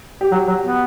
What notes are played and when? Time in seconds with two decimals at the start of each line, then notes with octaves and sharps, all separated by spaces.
0.21 G4
0.31 F#3 F#4
0.48 F#3
0.64 B3